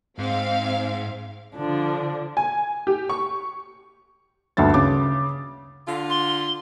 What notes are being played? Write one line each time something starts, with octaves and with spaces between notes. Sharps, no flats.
G#2 C4 F5
D3 F3 D4
G#5
G4
C#6
D2 G2 E5 A6
C#3 D6
D3 F4
C6